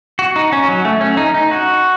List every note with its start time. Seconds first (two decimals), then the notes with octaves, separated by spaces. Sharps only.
0.19 F#4
0.36 D#4
0.52 C#4
0.68 F#3
0.85 A3
1.01 C#4
1.17 D#4
1.34 D#4
1.51 F#4